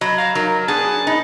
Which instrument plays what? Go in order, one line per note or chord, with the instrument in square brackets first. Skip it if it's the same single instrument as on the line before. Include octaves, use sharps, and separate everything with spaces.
[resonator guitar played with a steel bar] F#3 [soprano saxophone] D#5 [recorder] B5
[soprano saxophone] F5 [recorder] A#5
[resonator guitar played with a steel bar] F#3 [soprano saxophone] D#4 [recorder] A#4
[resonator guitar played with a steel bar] B3 G#4 [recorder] D4 [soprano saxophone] A5
[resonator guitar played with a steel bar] D#4 [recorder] B5